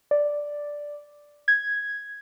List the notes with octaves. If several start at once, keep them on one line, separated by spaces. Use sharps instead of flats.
D5
G#6